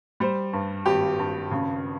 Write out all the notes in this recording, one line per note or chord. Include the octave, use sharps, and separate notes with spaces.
G3 C5
G2
G#1 G4
G2
C#3